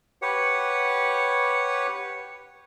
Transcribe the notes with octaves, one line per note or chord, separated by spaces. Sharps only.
G4 B4 C#5 F#5